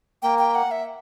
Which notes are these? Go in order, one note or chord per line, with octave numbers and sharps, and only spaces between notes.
A#3 G5
G5
F#5
E5